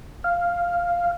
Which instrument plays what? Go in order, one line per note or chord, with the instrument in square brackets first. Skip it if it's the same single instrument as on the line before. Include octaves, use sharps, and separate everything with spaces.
[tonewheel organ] F5